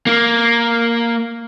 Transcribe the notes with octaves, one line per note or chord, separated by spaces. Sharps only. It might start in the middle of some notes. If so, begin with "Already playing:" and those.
A#3